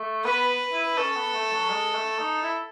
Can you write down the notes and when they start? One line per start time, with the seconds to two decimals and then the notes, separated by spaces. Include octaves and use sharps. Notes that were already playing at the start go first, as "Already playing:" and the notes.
Already playing: A3
0.24 B3 B4
0.73 E4
0.97 C#4 A4
1.16 B3
1.34 A3
1.53 F#3
1.70 G#3
1.95 A3
2.19 D#4
2.43 E4